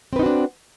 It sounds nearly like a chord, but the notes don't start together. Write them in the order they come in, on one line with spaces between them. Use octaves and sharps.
C4 B4 D#4 F#4 D4